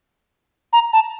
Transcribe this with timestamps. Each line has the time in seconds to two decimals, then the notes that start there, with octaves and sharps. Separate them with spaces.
0.73 A#5
0.93 A5